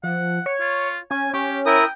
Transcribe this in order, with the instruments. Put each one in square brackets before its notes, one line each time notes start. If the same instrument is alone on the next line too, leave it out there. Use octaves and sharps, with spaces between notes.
[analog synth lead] F3 [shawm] F#5
[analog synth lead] C#5
[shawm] F4
[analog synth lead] C#4 [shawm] G#5
[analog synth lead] C#4 [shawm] G4
[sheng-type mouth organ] E4 A#4 D#6 [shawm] G5